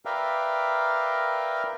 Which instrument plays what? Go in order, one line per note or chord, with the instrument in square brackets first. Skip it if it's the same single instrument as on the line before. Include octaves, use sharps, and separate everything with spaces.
[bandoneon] A#4 B4 D5 E5 F5 G5